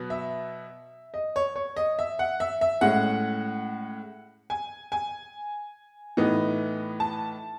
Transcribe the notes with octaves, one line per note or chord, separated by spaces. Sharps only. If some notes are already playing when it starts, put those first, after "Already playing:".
Already playing: B2 F#3 B3
E5
D#5
C#5
C#5
D#5
E5
F#5
E5
E5
A2 G#3 C#4 F#5
G#5
G#5
A2 E3 B3 D#4
A5